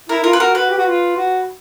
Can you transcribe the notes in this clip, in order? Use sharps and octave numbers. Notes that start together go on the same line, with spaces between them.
E4 A#4
F4 A#4
B4
F#4 A#4
F#4 B4
G4
F#4
F4
F#4